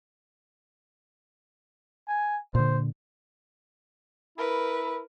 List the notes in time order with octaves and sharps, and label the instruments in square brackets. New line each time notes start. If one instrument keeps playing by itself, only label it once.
[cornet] G#5
[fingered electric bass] A#2 D3 [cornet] C5
[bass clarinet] E4 [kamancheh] A#4 B4